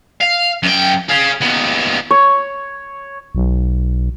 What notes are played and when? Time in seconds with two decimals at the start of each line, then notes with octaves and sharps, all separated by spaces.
0.21 F5
0.63 F#2 G5
1.09 G#4 F5
1.41 D#2 B3
2.11 C#5
3.35 B1